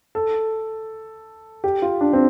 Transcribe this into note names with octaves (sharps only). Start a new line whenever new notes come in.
A4
G4
F4
D4
C4